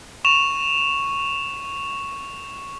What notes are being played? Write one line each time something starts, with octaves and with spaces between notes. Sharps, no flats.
C#6 E7 F7